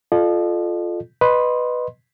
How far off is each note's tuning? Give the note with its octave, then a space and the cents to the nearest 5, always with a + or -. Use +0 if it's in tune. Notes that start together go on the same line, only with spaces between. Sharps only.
F4 +0 A4 -20 D#5 -45
B4 +0 D#5 -15 C6 +15